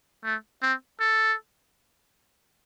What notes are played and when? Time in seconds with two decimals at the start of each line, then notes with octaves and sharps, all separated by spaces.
0.24 A3
0.62 C4
1.00 A4